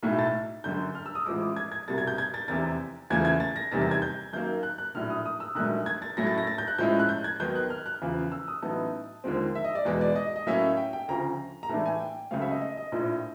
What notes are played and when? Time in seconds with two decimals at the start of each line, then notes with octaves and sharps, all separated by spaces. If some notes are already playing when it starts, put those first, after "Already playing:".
0.03 B1 A2 F#3 A3
0.19 A6
0.64 G1 F#2 D3 G6
0.95 F6
1.06 E6
1.15 D#6
1.26 A1 A2 F3 G#3 D6
1.41 D6
1.56 G#6
1.72 G#6
1.88 C2 B2 G3 A6
1.98 G#6
2.07 G6
2.18 G#6
2.34 A6
2.48 F1 E2 C3 A6
3.10 E2 C#3 F3 A3 G#6
3.25 G#6
3.40 A6
3.56 A#6
3.72 F1 E2 C3 D#3 G3 A6
3.82 A6
3.91 G#6
4.02 G6
4.33 F#2 D#3 F#3 A#3 G6
4.63 F#6
4.78 F#6
4.95 A#1 A2 F#3 F6
5.10 D#6
5.26 D#6
5.40 E6
5.55 A#1 G#2 D#3 F#3 A3 F#6
5.86 G#6
6.02 A6
6.17 A2 F#3 A3 C#4 E4 A#6
6.27 A6
6.38 A#6
6.47 A6
6.58 G6
6.68 F#6
6.78 A2 F3 G#3 C#4 E4 G6
6.99 F#6
7.09 G6
7.24 G#6
7.39 D#2 D#3 F#3 B3 D#4 G6
7.55 F#6
7.70 F6
7.86 F#6
8.02 E2 C#3 F3
8.32 E6
8.48 D#6
8.62 A1 A2 F#3 B3 D#4 A5
9.24 D#2 D3 F3 G#3 C4
9.55 E5
9.64 D#5
9.75 D5
9.85 E2 B2 G#3 B3
10.01 D5
10.16 D#5
10.36 D#5
10.47 A2 F#3 A#3 C#4 E5
10.77 G5
10.93 G5
11.08 D2 C#3 F3 A#5
11.63 A#5
11.69 A2 E3 A3 D4 A5
11.86 G#5
12.00 G5
12.31 C#2 C#3 F#3 A3 C4 F5
12.42 E5
12.51 D#5
12.62 D#5
12.77 D#5
12.92 A#1 A2 F3